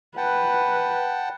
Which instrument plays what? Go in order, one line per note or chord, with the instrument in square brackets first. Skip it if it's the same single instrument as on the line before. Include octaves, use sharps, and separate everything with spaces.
[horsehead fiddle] B4 [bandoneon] F#5 G5 A5